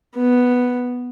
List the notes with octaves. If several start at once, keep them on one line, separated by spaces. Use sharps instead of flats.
B3